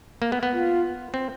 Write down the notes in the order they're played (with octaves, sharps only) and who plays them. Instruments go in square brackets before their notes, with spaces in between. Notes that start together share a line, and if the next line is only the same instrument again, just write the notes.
[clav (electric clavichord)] A#3
B3
B3
[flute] F4
[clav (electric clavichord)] C4